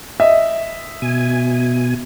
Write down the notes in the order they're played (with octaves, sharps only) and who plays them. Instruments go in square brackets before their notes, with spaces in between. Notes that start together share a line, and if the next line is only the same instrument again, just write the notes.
[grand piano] D#5 E5
[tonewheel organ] B2 G#5